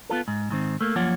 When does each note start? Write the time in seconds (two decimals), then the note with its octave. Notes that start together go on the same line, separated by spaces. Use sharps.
0.09 B3 F4 A4
0.28 G#2
0.50 G#2 D#3 C4
0.81 A3 A#3
0.96 F#2 F3 A#3 F4 C#5 F#5